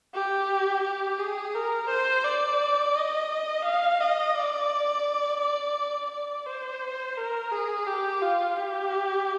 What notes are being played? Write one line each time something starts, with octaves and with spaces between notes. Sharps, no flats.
G4
G4
G#4
A#4
C5
D5
D#5
F5
D#5
D5
D5
D5
C5
A#4
G#4
G4
F4
G4